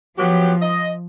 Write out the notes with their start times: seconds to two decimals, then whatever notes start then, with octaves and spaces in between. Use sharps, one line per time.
0.18 F3 F#3 B3 G4
0.62 D#5